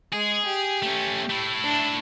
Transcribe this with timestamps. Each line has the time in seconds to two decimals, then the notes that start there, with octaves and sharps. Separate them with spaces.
0.13 G#3 G#4
0.46 G4
0.82 A3 C#4
1.30 A3 E4
1.64 D4